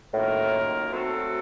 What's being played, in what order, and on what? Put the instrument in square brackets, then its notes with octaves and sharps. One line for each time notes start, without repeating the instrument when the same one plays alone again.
[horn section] F#2 D#3 A#3 F4 A#4 [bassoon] A2
[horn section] F#3 A3 C4 F#4 A4